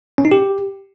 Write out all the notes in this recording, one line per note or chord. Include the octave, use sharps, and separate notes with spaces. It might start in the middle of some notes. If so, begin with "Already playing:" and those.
C#4
D#4
G4